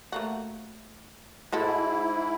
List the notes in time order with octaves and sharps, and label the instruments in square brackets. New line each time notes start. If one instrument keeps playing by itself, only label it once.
[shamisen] A3 A#3 F#4
[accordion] G#2 E4 [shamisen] G#3 F#4 A4